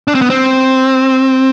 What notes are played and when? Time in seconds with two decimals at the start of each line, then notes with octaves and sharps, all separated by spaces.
0.08 D4
0.15 C4
0.22 B3
0.30 C4